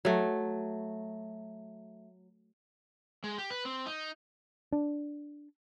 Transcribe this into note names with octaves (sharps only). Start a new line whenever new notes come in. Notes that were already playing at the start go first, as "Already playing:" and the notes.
F#3 A3
G#3
G4
B4
C4
D#4
D4